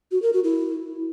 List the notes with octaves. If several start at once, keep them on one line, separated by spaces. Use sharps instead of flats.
F#4
A#4
F#4
E4